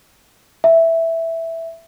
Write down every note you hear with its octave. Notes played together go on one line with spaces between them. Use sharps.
E5